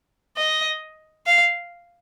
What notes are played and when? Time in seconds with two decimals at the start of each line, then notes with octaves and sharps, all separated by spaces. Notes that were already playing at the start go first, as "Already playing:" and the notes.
0.37 D#5
1.26 F5